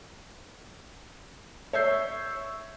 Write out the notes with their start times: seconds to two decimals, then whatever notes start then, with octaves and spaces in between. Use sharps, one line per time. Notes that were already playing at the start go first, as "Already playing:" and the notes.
1.73 C#5 E5 C#6 E6 G6 C7